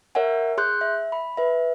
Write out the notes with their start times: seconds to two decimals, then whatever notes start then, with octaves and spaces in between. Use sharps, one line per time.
0.15 A#4 C#5 E5 F#5 G#5
0.58 G#4 C6 F#6 G6
0.81 E5
1.12 B5
1.37 B4 E5